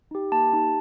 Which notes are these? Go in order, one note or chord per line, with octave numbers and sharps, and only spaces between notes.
D#4 G4
A#3 A5
D#4 G4